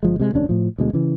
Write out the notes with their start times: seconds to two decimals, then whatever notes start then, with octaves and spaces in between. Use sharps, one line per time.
0.03 G1 F3 G#3
0.20 C3 G#3
0.33 F1 D#2 C#4 D4
0.49 A2 F3
0.78 D2 B2 G#3
0.93 C#3 E3